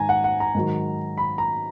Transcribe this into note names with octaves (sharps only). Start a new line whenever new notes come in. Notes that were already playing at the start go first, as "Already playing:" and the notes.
Already playing: G#2 D#3 G#5 A#5
F#5
F#5
A#5
G#2 D#3 F#3
B5
A#5